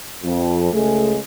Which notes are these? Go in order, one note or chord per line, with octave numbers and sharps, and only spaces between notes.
F2
C#2 G#3 A3 G#4